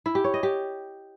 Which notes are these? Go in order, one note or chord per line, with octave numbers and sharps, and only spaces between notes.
E4
G4
C#5
D#5
G4